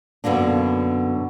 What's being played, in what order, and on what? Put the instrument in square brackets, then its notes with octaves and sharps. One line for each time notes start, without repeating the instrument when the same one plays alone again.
[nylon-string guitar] F#2 B2 D3 A#3 D4